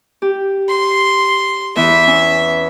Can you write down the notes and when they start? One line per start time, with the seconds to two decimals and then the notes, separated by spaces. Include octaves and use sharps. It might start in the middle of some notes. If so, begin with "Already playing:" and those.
0.22 G4
0.69 C6
1.76 E2 E3 E5 D#6
2.07 C#4